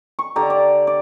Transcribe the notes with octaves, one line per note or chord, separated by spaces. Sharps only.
C#6
D3 G4 A#5
D5
D5